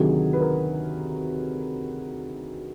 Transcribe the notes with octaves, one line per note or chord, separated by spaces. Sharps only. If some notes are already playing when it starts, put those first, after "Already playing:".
Already playing: D2 C3 D#3 F#3 G#4
B4
A#4